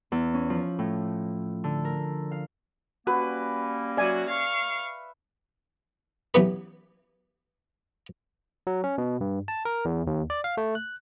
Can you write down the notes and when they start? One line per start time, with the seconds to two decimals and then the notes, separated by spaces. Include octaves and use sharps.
0.12 E2
0.34 C#4
0.50 F3
0.79 A2
1.64 D3
1.85 A#4
2.31 F5
3.07 G3 A#3 C#4 F#4 B4
3.97 F#3 F#4 D5 E5 G#5
4.28 F5 C#6
6.34 C#3 E3 F#3 B3 G4 B4
8.67 F#3
8.84 C#4
8.98 B2
9.21 G2
9.48 A5
9.65 A#4
9.85 E2
10.07 D#2
10.30 D5
10.44 F5
10.57 A3
10.75 F#6